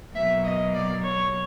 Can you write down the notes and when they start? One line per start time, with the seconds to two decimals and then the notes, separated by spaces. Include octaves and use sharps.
0.14 B2 F#3 A#3 E5
0.44 D#5
0.74 D5
1.03 C#5